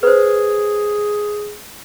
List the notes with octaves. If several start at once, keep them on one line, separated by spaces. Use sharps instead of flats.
G#4 B4 C5